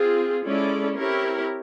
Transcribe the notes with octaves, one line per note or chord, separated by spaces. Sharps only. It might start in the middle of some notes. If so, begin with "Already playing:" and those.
Already playing: C4 F4 G#4
G#3 C#4 E4 A4 D5
C4 E4 G4 A#4 C#5